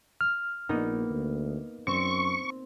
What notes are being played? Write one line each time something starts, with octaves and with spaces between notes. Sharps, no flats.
F6
A#1 A#3 B3 D#4
D2
F#2 C4 C#6